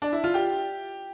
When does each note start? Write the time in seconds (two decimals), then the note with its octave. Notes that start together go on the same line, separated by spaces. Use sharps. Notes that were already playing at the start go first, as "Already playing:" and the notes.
0.02 D4
0.12 E4
0.24 F4
0.34 G4